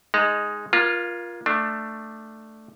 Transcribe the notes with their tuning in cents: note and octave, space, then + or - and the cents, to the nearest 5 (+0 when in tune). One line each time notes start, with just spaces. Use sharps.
G#3 +0 D#4 +0 A#5 -35
A#3 +30 F4 +0
A3 +5 D4 +20